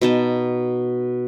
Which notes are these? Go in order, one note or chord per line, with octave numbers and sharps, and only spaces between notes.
B2 D#4 A5